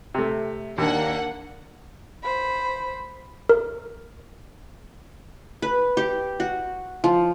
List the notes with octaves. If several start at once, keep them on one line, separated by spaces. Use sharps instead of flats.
C3 A3
D#2 A#3 D4 F#5
C5 B5
A#4
B4
G4
F#4
F3